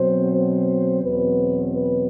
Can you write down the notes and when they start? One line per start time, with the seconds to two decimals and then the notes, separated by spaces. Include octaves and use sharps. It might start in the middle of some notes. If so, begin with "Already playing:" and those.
Already playing: B2 F#3 C4 C5
0.32 C5
1.02 E2 B2 F#3 C4 B4
1.70 B4